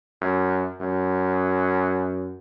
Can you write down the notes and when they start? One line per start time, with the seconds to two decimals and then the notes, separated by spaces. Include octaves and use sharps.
0.21 F#2
0.80 F#2